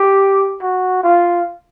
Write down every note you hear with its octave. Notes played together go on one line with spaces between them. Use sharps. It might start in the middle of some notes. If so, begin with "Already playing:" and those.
Already playing: G4
F#4
F4